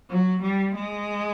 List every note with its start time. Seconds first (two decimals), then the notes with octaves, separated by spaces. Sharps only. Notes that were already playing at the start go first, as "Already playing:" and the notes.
0.10 F#3
0.43 G3
0.75 G#3